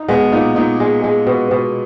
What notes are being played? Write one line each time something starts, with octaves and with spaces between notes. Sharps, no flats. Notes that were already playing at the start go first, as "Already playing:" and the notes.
Already playing: D#4
B2 G#3 B3
A#2 A#3 D#4
A#2 A#3 D#4
G#3
G#3
B2
B2